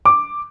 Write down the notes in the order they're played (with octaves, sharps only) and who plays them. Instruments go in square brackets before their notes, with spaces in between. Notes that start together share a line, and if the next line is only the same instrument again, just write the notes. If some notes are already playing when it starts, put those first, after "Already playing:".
[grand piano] D6